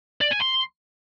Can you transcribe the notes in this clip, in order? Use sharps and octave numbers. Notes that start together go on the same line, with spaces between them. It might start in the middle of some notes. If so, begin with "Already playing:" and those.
D5
G#5
C6